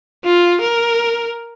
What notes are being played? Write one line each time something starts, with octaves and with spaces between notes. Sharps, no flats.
F4
A#4